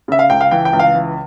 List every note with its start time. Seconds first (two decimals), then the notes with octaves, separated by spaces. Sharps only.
0.08 C#3 E5
0.19 F5
0.30 C#2 G5
0.41 F5
0.51 E3 G5
0.65 G5
0.73 C#2
0.79 F5
0.94 E3